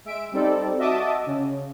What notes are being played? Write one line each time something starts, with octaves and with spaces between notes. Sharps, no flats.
G#3 E5 D7
G3 C4 D#4 A4 D5
F#4 D#5 E5 A5 D6 D#6
C#3